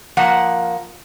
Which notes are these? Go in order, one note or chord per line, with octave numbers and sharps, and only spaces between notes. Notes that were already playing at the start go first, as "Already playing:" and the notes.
F3 A#3 F#5